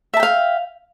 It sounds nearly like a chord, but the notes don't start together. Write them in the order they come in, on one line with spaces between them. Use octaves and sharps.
E5 A5 G5 F5